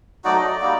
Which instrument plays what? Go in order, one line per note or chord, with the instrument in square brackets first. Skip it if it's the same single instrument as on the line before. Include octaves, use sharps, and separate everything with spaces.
[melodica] F#3 A3 D#4 F#4 D5
D#5
D5
G3 A#3 D#4 F#4